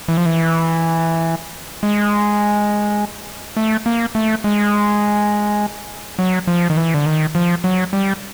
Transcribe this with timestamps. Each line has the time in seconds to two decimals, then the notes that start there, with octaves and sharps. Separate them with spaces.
0.08 E3
0.17 F3
0.25 E3
1.83 G#3
3.57 A3
3.86 A#3
4.15 A3
4.44 G#3
6.19 F#3
6.47 F3
6.70 D#3
6.77 E3
6.94 D3
7.06 D#3
7.35 F3
7.64 F#3
7.93 G3